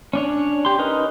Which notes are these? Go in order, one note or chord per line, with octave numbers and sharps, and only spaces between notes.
C#4 D4 C#5
G4 C6
C#4 D#4 A#4 B4